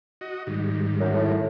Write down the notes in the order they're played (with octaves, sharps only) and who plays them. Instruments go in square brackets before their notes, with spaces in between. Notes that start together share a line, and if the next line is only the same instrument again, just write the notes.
[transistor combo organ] F#4 D#5
G#2 D#3 G3
[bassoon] F#2
A2